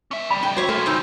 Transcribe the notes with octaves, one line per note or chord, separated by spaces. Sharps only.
C#4 E5
D2 G3 B5
C#4 G5
F#3 C5 C#5 E5
E3 A3 A#3 F4
C4 D#4 E6